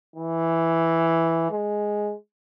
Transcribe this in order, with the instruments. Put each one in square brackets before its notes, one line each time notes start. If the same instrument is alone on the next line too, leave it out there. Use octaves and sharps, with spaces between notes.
[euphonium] E3
G#3